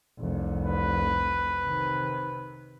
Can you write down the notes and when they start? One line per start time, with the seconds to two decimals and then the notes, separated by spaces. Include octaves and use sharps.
0.19 F1 C2
0.65 B4
1.63 C3 D#3